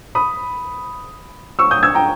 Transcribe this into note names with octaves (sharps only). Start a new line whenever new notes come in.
B5 D#6
C#6 E6
D#6 G6
E6 G#6
G5 A#5